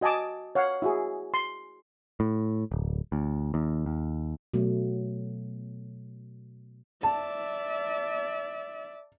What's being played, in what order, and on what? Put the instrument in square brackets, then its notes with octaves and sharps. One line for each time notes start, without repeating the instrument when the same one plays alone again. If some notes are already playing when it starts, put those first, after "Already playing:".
[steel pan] F#4 D#5 G#5 A5 D6
C#5 F5 F#5
E4 F#4 G#4
C6
[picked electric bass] A2
D1
D2
D#2
D#2
[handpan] B2 F#3 A3
[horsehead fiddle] D5 E5 [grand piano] A5